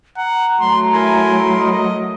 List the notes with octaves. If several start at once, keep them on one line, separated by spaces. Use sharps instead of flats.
F#5 A#5
F#3 A3 C6
E4 A#4 G#5 C6
D#5